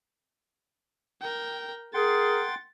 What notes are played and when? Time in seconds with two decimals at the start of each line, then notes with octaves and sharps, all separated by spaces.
1.22 A#4 G5
1.94 G#4 A#4 F#5 G5 C6 A6